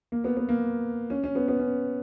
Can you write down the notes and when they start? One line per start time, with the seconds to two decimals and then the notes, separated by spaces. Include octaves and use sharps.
0.12 A#3
0.24 B3
0.37 B3
0.49 A#3
1.10 C#4
1.24 C#4
1.35 B3
1.48 B3
1.59 C#4